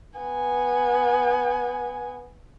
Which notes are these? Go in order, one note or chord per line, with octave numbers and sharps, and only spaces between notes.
B3 G#5